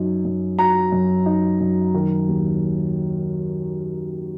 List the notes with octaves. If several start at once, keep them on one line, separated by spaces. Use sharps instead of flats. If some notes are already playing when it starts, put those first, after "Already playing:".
Already playing: F#2 F#3 D#4
F#2
F#3 A#5
F#2
D#4
F#2
D#3
D#2